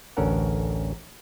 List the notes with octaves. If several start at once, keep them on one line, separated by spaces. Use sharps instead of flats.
A1 D2 C#4 A4 A#4 F#5